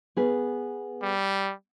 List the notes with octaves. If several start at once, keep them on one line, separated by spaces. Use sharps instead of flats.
B3 G#4 B4
G3